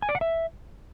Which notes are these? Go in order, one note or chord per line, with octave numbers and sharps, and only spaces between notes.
G#5
D5
F#5
E5